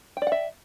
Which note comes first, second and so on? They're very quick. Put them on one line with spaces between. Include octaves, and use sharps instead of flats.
G5 D5 F#5 E5